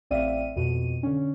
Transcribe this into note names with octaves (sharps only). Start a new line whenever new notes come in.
A1 C4 D5 E5 F5 D#7
F2 B2 D#7
D3 C#4